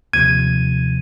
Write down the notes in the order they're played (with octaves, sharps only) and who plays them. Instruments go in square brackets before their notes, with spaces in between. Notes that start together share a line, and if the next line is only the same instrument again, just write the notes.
[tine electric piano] D#2 C3 F3 [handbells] G#6 [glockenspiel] D#7